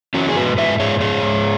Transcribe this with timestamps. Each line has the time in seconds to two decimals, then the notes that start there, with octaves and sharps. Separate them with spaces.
0.14 E3 C#4 F#4
0.29 G#4
0.36 G#2 F#4 B4
0.58 G#2 B4 E5
0.79 G#2 G#4 C#5
1.00 G#2 G#4 C#5
1.22 G#2